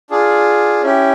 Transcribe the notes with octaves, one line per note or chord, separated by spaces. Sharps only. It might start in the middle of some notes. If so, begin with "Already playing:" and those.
D4 F4 G#4
C#4 E4 G4